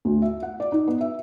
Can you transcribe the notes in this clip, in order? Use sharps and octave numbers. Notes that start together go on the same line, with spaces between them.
D2
E5
F#5
D5
D#4
B3
E5